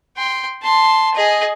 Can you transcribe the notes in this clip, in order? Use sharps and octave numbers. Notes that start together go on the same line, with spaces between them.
G5 C6
A5 C6
G#4 D#5